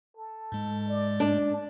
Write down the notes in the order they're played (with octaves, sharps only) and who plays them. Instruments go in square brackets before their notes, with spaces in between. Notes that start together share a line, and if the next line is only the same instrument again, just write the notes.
[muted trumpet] A4
[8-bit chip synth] G#2 G#3
[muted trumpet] D5
[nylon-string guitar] D4